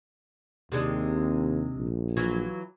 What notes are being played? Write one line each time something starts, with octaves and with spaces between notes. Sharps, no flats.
D#2 C3 G#3 D4
A#1
E3 F#3 F4